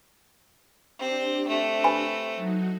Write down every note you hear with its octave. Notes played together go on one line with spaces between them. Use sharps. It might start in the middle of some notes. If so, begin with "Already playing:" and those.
C4 D4 G4 C5
A3 C4
B4 G#5 B5
F#3 D#4 F#4